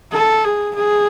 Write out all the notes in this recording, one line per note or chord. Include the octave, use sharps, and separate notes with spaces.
A4
G#4
G#4